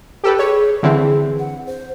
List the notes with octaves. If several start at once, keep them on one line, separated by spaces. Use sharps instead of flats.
G4 A4 B4
G#4 C#5
D3 E3 C4
F#5
C5